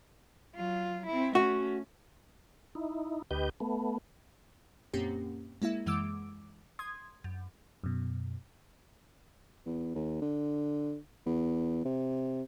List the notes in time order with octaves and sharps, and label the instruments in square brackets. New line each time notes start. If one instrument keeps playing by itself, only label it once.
[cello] F#3 F4
C4 E4
[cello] A3 C#4 [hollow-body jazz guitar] F#4
[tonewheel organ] D#4 E4
D2 G4 B4 D#5 G6
A3 B3
[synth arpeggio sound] F#2 A#2 A#3 C4 C#4 G4
G#3 A#3 E4 E5
F#2 E3 G#3 D6 E6 D7
C6 D#6 G#6
F#2
[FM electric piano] F#2 B2
[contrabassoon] E2
D#2
D3
E2
C3